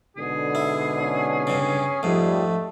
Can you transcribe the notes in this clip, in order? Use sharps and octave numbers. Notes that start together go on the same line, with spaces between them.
G#2 B2 D3 G#4
E4
C#4
G2 C#3
F2 G#2 F3 G3 A3